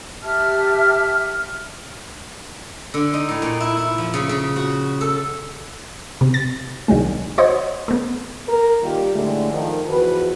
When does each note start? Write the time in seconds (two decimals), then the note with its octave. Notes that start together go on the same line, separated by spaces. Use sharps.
0.23 G4 E5 A5 F6
2.94 D3
3.13 D#4
3.29 A2
3.42 A#2
3.60 E4
3.77 E4
3.98 F3
4.14 C#3
4.29 C#3
4.56 F#4
5.01 A4
6.21 C3
6.34 A6
6.88 C2 D#3 F#3 G#3
7.38 F#4 C5 C#5 D#5
7.88 A3 B3
8.48 A#4
8.83 D#3 G3 A#3 F4 G4
9.14 A2 D3 G#3 A3
9.52 D#3 F3
9.89 E2 F3 F#4 B4